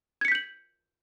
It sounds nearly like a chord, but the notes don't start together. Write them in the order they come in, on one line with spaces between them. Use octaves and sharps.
G#6 C#7 B6 G6 F#7